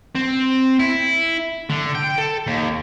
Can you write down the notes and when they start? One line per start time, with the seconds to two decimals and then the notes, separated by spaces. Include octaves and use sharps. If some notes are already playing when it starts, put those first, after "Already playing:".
0.15 C4
0.80 E4
1.70 D3
1.95 G5
2.18 A4
2.47 D#2